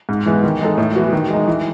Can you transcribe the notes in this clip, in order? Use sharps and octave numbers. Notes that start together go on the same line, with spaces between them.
G#2
E3 G#3 B3
D#3
G#3 D#4 A4
A2
E3 B3 F#4
D#3
G#3 D#4
E3